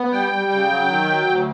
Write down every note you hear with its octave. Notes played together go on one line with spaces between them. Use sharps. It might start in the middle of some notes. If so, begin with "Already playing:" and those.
Already playing: B3
G3 G5
G3
C#3
F#3
D#3
F#3
D2